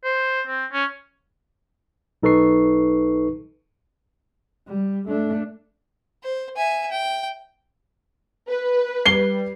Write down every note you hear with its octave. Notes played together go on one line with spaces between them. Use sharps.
C5
C4
C#4
B1 D#4 A4 B4 C#6 C7
G3
A3 D4
C5
E5 G#5
G5
B4
G3 C7 G7